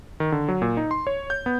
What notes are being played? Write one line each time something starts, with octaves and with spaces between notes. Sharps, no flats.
D#3
D3
F#3
A#2
D#4
C6
C#5
G6
B3